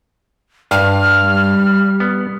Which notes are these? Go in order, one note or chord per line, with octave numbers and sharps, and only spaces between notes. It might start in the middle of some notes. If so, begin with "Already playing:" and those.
G2 F6
G3
B3